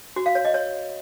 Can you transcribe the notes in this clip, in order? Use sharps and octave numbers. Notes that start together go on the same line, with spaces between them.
F#4
F5
C#5
D#5
C#5